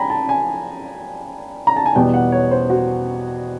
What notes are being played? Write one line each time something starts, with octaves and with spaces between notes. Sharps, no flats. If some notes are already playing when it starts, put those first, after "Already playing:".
Already playing: G5 G#5 A#5 B5
A5
G#5
A#5
A5
G#5
E2 B2 G3 B3 G5
F#5
C#5
C5
F#4